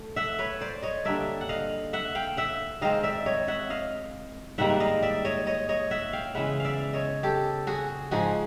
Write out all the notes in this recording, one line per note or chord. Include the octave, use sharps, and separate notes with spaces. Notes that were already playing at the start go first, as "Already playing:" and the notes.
Already playing: A3
E5 F#5
B4 C#5
C5 D5
C#5 D#5
D3 G3 A#3 D4 D5 E5
F#5
D#5 F5
E5 F#5
F5 G5
E5 F#5
D#3 G#3 C4 D#5 F5
D5 E5
C#5 D#5
E5 F#5
D#5 F5
G#2 D#3 G3 A#3 E5 F#5
D#5 F5
D5 E5
C#5 D#5
C#5 D#5
C#5 D#5
E5 F#5
F5 G5
C#3 E3 G#3 B3 E5 F#5
D5 E5 F5
C#5 D#5
G4 A4
F#4 G#4
G#2 F3 G#3 F#4 G#4